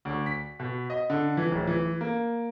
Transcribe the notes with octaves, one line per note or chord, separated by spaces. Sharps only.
D2
B6
B2
D#5
D3
E3
D1
E3
A#3